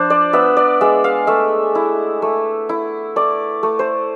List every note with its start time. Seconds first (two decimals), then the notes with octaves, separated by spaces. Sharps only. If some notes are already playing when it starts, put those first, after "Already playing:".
Already playing: F3 D4 C5
0.10 D5
0.33 B3 E5
0.57 D5
0.81 G#3 E5
1.04 F5
1.27 A3 E5
1.75 E4
2.22 A3
2.69 E4
3.16 A3 D5
3.63 A3
3.79 C5